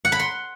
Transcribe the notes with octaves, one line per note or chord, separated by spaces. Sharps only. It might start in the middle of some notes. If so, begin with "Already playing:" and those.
F#5
B5
C6